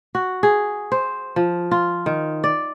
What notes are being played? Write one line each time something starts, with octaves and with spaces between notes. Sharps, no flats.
F#4
G#4
C5
F3
F4
D#3
D5